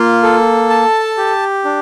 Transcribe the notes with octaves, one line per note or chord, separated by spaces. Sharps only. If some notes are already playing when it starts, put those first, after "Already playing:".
Already playing: A#3 F4
A4
A5
G4
D4